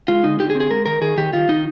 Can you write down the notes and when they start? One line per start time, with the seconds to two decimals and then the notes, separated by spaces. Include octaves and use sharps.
0.08 G#3 F4
0.24 D3 D#4
0.39 D3 G4
0.50 G#4
0.55 C4
0.60 G#4
0.70 G#3 A#4
0.86 D#3 A#4
1.01 D#3 G#4
1.17 D#3 G4
1.33 D#3 F4
1.49 D#3 D#4